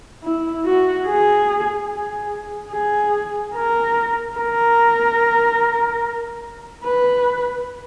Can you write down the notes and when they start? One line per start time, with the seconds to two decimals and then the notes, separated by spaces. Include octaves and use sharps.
0.23 E4
0.65 F#4
1.07 G#4
1.89 G#4
2.71 G#4
3.54 A#4
4.37 A#4
6.84 B4